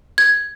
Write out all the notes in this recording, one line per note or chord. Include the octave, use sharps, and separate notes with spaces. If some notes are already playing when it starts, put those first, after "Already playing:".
G#6